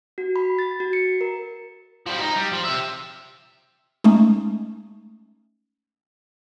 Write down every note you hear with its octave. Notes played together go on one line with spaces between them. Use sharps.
F#4
B5
A6
F#4
C#7
A#4
F3 G3
D#4
G3
F3
G4 E5
G#3 A3 C#4 D#4